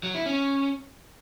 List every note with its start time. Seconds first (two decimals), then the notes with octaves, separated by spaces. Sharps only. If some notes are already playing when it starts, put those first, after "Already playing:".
0.03 F#3
0.15 E4
0.26 C#4